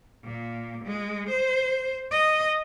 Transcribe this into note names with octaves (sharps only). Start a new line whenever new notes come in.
A#2
G#3
C5
D#5